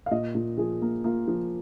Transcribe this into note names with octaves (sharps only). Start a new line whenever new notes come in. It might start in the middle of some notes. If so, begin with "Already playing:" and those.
F5
A#2 D#5
A#2
F3 G#4
A#3
A#3 F4
F3